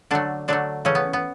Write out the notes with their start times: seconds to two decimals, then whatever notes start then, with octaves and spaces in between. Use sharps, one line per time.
0.11 D3 F#3 A3 D4
0.48 D3 F#3 A3 D4
0.85 C#3 E3 A3 C#4
0.95 B3
1.13 B3